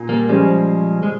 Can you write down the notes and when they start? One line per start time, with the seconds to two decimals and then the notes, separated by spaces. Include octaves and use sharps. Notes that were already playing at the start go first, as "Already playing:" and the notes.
Already playing: A#2 G#4
0.09 G3 A#3
0.29 F3 G3 G#3 C#4 G#4 C5
1.03 G#3